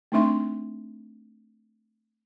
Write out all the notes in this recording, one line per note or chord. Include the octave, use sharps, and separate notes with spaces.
A3 C4 D4 D#4 E5 C6